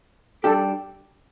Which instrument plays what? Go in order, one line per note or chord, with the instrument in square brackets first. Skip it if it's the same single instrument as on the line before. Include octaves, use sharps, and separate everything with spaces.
[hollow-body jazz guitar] G3 D4 G4 [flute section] A4